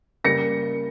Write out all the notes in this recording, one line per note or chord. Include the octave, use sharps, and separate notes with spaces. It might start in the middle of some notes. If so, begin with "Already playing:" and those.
C#3 G3 A#3 A#6 C#7